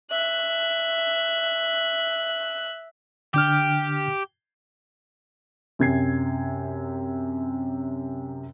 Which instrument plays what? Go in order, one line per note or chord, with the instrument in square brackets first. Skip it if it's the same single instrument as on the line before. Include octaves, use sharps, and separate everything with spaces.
[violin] E5 F#6
[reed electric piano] D3 D4 F6 [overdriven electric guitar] G4
[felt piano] F#2 C3 G#6 C7